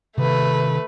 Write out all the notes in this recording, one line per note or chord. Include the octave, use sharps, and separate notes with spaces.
C3 D#3 A3 B4